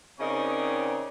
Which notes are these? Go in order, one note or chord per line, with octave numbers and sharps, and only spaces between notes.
C#3 C4 D#4 A#4 C#5 D5